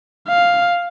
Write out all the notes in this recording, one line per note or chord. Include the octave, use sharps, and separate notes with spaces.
F5